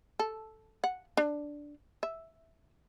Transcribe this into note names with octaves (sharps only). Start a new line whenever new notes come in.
A4
F#5
D4
E5